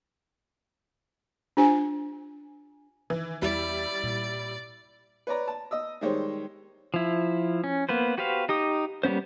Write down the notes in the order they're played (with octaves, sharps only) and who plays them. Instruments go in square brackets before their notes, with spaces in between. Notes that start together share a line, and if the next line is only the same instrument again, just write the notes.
[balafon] D4 F4 G4 C5 G#5
[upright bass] D#3 [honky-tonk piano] E3
[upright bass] E2 [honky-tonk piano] G3 E4 [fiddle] D5
[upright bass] A#2
[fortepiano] B4 C#5 D5 A#5
A5
D#5 D#6 E6
D#3 G3 G#3 G4 C5 C#5
[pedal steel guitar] F3 E4
C#4
A#3 B3 B4 C5
F#4 G4 B4 C5 F5
D#4 G4 D#6
G3 A#3 B3 C#4 C5